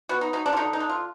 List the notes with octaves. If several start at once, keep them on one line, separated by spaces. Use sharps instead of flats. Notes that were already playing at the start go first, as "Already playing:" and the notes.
B3 F#4
D#4
F#3 D#4
D4
F4
D3 D#4
D#4
D3
F4